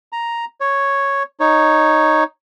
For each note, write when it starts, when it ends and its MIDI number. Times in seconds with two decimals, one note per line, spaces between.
0.12 0.45 82
0.61 1.23 73
1.40 2.24 63
1.40 2.24 73